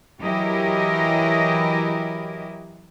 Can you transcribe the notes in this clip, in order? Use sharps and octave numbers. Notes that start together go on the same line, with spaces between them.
E3 F#3 E4 G4 A#4 D#5